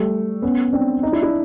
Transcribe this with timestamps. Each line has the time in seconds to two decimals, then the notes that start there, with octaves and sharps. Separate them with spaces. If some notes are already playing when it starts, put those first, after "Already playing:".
Already playing: G3 A3
0.42 B3 C#4
0.73 C4 D4
1.02 C#4 D#4
1.12 D4 E4
1.22 D4 E4